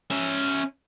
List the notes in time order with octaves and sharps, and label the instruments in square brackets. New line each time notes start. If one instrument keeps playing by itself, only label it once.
[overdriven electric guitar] C#4 E5